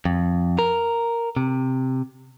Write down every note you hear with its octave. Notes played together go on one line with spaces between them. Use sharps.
F2
A#4
C3